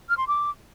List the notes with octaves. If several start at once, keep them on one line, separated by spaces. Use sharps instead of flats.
F6
C6
D6